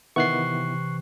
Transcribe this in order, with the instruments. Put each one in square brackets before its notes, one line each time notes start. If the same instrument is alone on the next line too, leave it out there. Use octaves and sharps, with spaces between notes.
[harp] C3 E3 [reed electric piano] D#3 B3 E4 [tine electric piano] C#6 F#6 C7